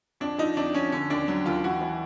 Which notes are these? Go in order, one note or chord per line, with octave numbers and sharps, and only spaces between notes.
F2 D4
F3 D#4
F2 D4
F3 C#4
D3 C#4
D#2 D4
F#3
D#2 F4
E3 F#4
E3